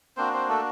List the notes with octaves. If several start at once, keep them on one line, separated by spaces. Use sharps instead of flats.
A#3 C4 D4 F#4 C5
C4 C5
A3 A4